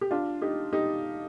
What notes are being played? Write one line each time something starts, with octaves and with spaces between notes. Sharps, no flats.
G4
D4 F4
D#4 G4
D#4 G4